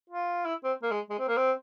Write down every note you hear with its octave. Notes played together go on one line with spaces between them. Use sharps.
F4
E4
C4
A#3
G#3
G#3
C4
A#3
C4